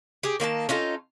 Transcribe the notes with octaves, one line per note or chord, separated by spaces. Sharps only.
G4 G#4
D#3 A#3 D4 A5
C#4 D#4 F4 A4